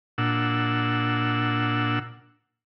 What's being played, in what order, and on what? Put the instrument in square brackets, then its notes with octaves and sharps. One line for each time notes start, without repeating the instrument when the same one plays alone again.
[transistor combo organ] A#2 D4 F#5 E6